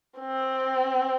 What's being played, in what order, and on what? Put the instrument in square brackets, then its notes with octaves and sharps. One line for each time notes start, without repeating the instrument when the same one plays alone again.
[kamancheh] C4